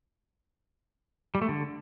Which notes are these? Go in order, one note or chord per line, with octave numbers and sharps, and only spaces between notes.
G3
A3
D3